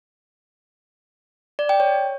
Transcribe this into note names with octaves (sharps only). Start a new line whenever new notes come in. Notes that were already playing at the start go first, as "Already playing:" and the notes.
D5
G5
C#5